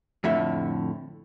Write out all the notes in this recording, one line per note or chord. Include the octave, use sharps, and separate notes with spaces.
F2 A2 D3 E5